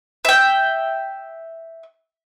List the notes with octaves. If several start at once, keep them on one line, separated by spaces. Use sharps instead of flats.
E5 G5